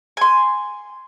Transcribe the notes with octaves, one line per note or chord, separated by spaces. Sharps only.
G#5 C6